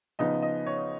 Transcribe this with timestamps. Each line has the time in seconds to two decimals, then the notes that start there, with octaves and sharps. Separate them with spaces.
0.19 C#3 F3 B3 D#4 D#5
0.42 D#5
0.67 C#5